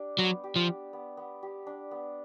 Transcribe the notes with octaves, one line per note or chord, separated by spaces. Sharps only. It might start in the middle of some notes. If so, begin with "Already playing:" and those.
Already playing: D4 G4
F#3 B3
G4
F3
D4
B3
B3
G4
D4
B3